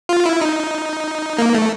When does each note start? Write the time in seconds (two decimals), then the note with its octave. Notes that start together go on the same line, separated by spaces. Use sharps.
0.09 F4
0.26 E4
0.41 D#4
1.38 A#3
1.54 A3